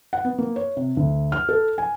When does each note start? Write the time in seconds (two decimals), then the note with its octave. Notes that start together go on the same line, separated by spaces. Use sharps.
0.13 F#5
0.25 B3
0.39 A#3
0.56 C#5
0.77 C3
0.97 D2
1.32 F6
1.49 A4
1.78 G#5